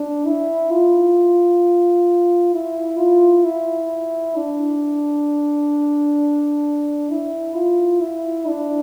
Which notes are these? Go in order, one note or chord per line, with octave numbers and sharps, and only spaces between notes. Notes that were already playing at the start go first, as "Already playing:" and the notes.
Already playing: D4
E4
F4
E4
F4
E4
D4
E4
F4
E4
D4